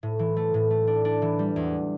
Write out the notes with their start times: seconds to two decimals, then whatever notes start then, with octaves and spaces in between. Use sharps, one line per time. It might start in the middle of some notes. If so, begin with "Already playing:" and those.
0.03 A2
0.19 E3
0.37 A3
0.54 A2
0.70 A3
0.87 D4
1.05 D4
1.22 E3
1.39 G3
1.56 E2